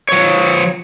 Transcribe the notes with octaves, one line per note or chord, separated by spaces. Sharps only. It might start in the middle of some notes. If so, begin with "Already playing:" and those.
F3 C#5